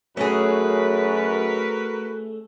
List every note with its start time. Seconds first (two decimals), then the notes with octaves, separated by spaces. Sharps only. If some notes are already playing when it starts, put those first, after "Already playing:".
0.17 F#2 A3 C#4 F#4 G#4 A#4 B4